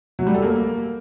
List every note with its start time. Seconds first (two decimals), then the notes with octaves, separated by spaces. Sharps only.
0.19 F#3
0.27 G3
0.34 A4
0.42 A#3